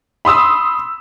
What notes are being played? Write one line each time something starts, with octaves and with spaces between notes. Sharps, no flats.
B5 C6 D#6 E6